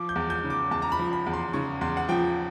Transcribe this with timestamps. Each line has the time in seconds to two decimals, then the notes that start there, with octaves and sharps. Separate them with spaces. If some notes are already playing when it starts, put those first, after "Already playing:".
Already playing: F3 D6
0.09 G6
0.16 E2
0.30 G6
0.44 C#3
0.50 D6
0.71 E2 A5
0.82 A#5
0.92 B5
0.99 F3
1.13 B5
1.26 E2
1.33 C6
1.53 C#3 C#6
1.81 E2 C6
1.97 F#5
2.09 F3 G5